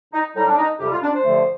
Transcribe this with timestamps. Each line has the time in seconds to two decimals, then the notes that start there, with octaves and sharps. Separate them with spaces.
0.13 D#4
0.35 A2 G3 D#4
0.48 D4
0.58 D#4
0.80 F2 C3 G3 G4
0.91 F4
1.02 D4
1.14 C5
1.25 G2 D3 F3 A3